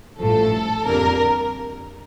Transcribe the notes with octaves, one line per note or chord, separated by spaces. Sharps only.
A1 G2 F3 A3 A4
F2 D3 G3 A#3 A#4